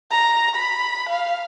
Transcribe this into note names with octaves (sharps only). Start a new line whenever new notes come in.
A#5
B5
F5